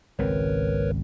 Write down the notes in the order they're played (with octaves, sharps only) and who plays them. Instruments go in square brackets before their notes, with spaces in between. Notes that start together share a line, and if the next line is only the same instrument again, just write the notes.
[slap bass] G#1 C#2 C4 [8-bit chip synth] A#4 B4 C#5